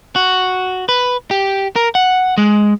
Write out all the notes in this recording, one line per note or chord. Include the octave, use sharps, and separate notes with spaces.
F#4
B4
G4
A#4
F#5
G#3